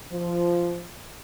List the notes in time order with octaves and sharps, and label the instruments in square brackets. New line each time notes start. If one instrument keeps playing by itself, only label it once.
[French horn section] F3